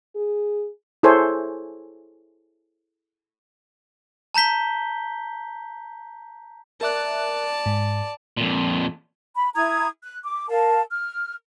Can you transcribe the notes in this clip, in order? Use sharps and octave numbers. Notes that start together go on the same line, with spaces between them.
G#4
E4 G#4 A4 C5 C#5 G#5
A5 A#5 G6 B6 G7
A#4 D5 E5 A5 F#6
G#2
F2 A#2
B5
E4 A#5 D#6 G#6
F#6
D6
A#4 F5 A5
F6